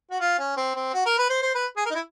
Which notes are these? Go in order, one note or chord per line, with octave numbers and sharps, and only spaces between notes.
F#4
F4
C#4
C4
C4
F#4
A#4
B4
C5
C5
B4
G#4
A#4
D#4
E4